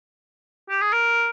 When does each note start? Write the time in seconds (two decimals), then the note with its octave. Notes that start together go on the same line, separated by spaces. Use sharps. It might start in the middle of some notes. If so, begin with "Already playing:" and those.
0.70 G4
0.81 G#4
0.93 A#4